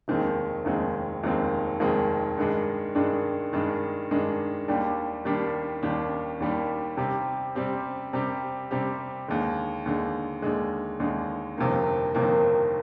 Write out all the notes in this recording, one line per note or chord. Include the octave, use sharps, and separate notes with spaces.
F1 D#2 D#3 G#3 C4
F1 D#2 D#3 G#3 C4
F1 D#2 D#3 G#3 C4
F1 D#2 D#3 G#3 C4
G2 D#3 G#3 D4
G2 D#3 G#3 D4
G2 D#3 G#3 D4
G2 D#3 G#3 D4
D#2 D#3 G3 D4 G4
D#2 D#3 G3 D4 G4
D#2 D#3 G3 D4 G4
D#2 D#3 G3 D4 G4
C3 G3 C4 G4
C3 G3 C4 G4
C3 G3 C4 G4
C3 G3 C4 G4
D#2 D3 G#3
D#2 D3 G#3
D#2 D3 G#3
D#2 D3 G#3
G1 F2 C3 D#3 A#3
G1 F2 C3 D#3 A#3